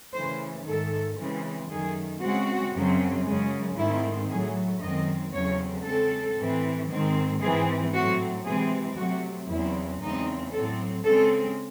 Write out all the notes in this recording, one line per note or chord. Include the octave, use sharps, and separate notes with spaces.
C#3 E3 A3 C5
G#2 D#3 A3 A4
C#3 E3 G#3 C4
F#2 D#3 A3 G#4
C#3 G#3 C4 F#4
F#2 C#3 F#3 C4
F#2 C#3 G#3
G#2 D#3 A3 C4 E4
A2 F#3 A3 G#4
F#2 D#3 G#3 C4 D#5
E2 C#3 F#3 A3 C4 C#5
C#3 G#3 C4 A4
A2 E3 C4
G#2 D#3 G#3 C4
G#2 E3 C4 G#4
A2 F#3 A3 C4 F#4
C3 E3 G#3 C4 G#4
C3 F#3 A3 C4 F#4
E2 C#3 F#3 C4 E4
E2 C#3 G#3 C4 D#4
A2 F#3 C4 A4
C#3 G#3 C4 A4